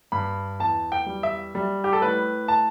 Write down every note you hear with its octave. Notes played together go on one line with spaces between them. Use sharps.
G2 B5
E2 A5
G5
G3
E5
G3
G4
A4
A2 B4
A5